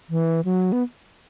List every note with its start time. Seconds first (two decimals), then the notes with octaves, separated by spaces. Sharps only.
0.10 E3
0.45 F#3
0.72 B3